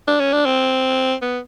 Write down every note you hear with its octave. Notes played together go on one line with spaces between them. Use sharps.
D4
C#4
D4
C4
B3